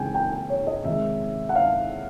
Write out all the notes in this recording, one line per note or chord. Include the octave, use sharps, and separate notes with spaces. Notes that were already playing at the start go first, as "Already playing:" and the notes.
Already playing: C#3 E3 G#3 C4 G5 G#5
G5
G5
C#5
D#5
C3 D#3 G#3 E5
F#5
F5